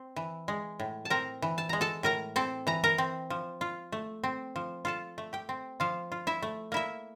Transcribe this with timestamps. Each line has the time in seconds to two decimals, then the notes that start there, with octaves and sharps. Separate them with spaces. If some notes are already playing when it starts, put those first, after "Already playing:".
Already playing: C4
0.16 E3
0.48 G#3
0.80 A2
1.05 A5
1.10 C4 A#4 A#5
1.42 E3
1.58 A5
1.69 G#3 A#5
1.81 A4 A5
2.03 A2 A#4 A#5
2.36 C4 A4 A5
2.67 E3 A#5
2.84 A#4 A#5
2.98 C4
3.30 F3
3.61 F4
3.92 A3
4.24 C4
4.56 F3
4.85 F4 A4 A5
5.18 A3
5.33 G4 G5
5.49 C4
5.80 F3 F4 F5
6.12 F4
6.27 E4 E5
6.42 A3
6.72 A#3 E4 E5